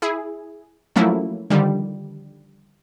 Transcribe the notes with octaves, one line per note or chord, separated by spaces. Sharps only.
E4 G#4
F3 F#3 A3 A#3 C#4 E4
D3 D#3 F3 G3